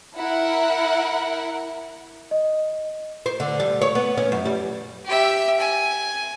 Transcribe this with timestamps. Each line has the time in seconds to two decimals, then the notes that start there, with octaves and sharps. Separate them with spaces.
0.17 E4 A#4 F#5
2.31 D#5
3.26 C5
3.40 D3
3.60 G3
3.82 C#5
3.95 B3
4.17 C#4
4.32 F#2
4.45 G3
5.05 G4 E5
5.60 G#5